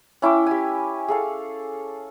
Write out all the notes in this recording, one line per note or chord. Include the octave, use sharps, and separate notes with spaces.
C#4 E4 G5 D6
G4 G#5
G#4 A4 F5